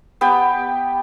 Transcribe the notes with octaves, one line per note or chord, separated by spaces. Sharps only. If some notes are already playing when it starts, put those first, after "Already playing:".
B3 G4 G5